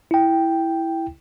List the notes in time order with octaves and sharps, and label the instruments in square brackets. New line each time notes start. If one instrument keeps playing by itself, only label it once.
[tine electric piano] E4 G5